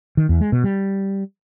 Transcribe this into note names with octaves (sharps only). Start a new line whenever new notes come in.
D#3
E2
G#3
B2
G3